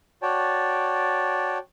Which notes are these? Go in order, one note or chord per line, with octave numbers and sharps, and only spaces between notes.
F#4 C#5 D5 G5 A5